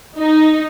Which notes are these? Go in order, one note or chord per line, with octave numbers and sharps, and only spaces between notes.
D#4